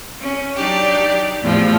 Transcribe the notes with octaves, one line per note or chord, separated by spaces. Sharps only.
C#4
F#3 D4 D#4 G4 D5
E2 A2 C3 F3